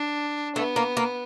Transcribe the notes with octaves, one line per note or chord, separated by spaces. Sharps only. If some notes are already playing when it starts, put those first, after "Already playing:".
Already playing: D4
A3 B3
A#3
A#3